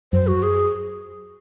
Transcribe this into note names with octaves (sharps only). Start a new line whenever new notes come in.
F#2 C5
F#4
G#4